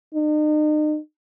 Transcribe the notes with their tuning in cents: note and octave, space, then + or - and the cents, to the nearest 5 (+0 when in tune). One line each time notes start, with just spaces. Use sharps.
D#4 -40